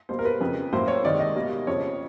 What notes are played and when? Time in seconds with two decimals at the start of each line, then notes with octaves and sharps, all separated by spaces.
0.09 B2 G3 A#3 C5
0.19 A#4
0.25 B4
0.41 F2 C#3 F3
0.72 A2 F#3 A#3 C5
0.88 C#5
1.04 C3 D#3 G#3 D5
1.20 D#5
1.36 B2 G3 A#3
1.67 F2 C#3 F3 C#5